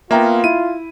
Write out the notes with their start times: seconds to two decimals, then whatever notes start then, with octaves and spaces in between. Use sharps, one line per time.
0.11 A#3 B3 F4 E5 G5 A#5
0.44 E4 D#7